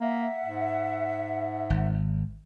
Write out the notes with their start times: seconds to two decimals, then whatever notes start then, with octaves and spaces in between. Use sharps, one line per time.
0.01 A#3 E5 F#5
0.44 G#2
1.70 G#1